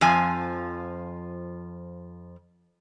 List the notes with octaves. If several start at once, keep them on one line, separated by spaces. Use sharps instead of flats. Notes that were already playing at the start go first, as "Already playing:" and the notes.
F2 F3 G#5